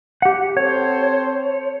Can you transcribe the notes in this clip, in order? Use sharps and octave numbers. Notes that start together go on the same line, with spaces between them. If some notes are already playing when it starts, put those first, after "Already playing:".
G4 F#5
C4 A4 C5 C#5